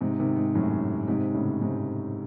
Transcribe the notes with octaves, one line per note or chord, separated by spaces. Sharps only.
G#2 C3
C3 D#3
G#2
F#2 A2
G#2 C3
A2 C#3
G#2 C3